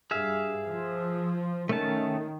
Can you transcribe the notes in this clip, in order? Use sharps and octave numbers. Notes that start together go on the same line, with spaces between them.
G2 G#4 E5 F5
F3
D#3 A3 C#4 A5